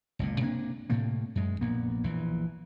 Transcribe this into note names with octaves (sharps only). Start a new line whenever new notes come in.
F#1 C#2 A#2
C3 A#3 D4
A2 C3 A3 A#3
F#2 G#3
A#1 A#3 B3
A#1 E3